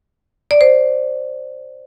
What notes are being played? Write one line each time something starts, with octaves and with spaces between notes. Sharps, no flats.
D5
C5